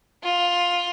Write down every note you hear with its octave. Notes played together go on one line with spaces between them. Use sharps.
F4